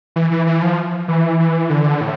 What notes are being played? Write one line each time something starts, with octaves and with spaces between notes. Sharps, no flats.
E3
E3
E3
F3
E3
E3
D3
A2